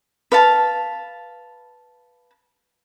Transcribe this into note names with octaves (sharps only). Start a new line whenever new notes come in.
B4 F5 A5